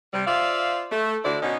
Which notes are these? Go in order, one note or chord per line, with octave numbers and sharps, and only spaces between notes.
C3 G3
F4 C5 D5 E5 F5
A3
D2 D3 E4 C5 D5
B2 C#4 D#4